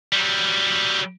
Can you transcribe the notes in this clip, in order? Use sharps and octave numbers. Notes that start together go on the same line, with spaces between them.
F#3 G3